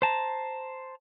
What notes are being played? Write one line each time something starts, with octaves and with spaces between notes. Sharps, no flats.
C5 A5 A#5